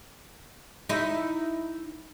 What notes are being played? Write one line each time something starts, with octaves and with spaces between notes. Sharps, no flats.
D#4 E4